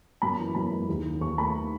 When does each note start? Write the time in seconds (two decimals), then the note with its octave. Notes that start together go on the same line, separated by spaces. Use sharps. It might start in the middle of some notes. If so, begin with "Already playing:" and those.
0.22 F#2 B5
0.39 E3
0.55 F#2 B5
0.72 G#3
0.89 D#2
1.05 D#3
1.21 D#2 C#6
1.38 A3 B5